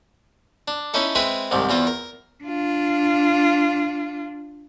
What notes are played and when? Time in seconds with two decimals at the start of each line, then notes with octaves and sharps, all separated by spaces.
0.68 D4
0.94 C#4 D#4 E4 A4
1.15 G#3 C4 G#4 B4 E5
1.51 C2 G#2 C3 D#3
1.69 E2 E3 F4 C5
1.87 A#4
2.44 D4 F4